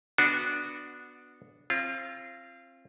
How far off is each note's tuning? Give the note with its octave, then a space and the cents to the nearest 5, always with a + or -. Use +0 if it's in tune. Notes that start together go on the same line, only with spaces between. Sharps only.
B3 +0 D4 +0 F#4 -15
C4 +25 F4 -20